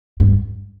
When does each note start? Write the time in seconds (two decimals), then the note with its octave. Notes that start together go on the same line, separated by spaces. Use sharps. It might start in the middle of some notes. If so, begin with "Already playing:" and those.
0.20 G2